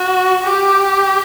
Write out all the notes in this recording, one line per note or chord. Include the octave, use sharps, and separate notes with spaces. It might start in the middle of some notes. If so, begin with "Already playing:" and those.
Already playing: F#4
G4